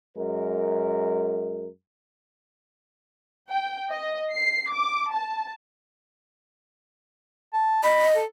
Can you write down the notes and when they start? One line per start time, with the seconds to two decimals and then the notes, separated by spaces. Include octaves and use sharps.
0.17 F#2 G#3 A#4
3.49 G5
3.91 D#5
4.34 C7
4.72 D6
5.14 A5
7.53 A5
7.84 D#5 B5
8.15 A4